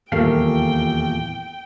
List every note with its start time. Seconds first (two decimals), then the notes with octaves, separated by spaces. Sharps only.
0.12 D#1 E2 A#2 A3 A#4 F5 G5